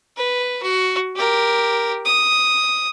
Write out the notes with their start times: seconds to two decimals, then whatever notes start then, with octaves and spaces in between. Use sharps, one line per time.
0.17 B4
0.63 F#4
1.16 G4 A#4
2.06 D#6